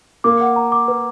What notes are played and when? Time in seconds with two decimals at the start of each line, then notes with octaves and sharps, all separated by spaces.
0.24 A#3 D6
0.41 F#5
0.56 A#5
0.72 D6
0.88 B4